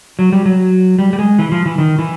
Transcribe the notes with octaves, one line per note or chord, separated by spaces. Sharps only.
F#3
G3
F#3
G3
G3
G#3
E3
F3
E3
D#3
E3